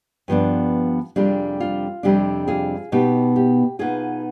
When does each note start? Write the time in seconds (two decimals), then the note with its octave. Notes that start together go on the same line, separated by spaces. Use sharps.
0.28 G2 F3 B3 D4
1.16 F2 C3 G3 D4 F4 G#4
1.60 F4
2.03 F2 C3 G3 D4 G4
2.48 F4 G#4
2.92 B2 B3 D#4 G4
3.36 G4
3.79 B2 B3 D#4 F4 G#4